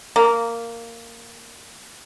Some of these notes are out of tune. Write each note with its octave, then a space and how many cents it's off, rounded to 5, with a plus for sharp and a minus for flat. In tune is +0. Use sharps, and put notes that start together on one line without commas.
A#3 -10